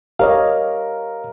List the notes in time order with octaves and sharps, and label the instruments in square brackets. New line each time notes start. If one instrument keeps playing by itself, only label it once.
[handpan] G4 C#5 D#5 [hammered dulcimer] A#4 [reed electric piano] F5